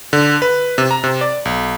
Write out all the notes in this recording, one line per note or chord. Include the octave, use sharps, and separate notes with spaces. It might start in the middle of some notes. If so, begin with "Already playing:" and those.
D3
B4
C3
A#5
C3
D5
B1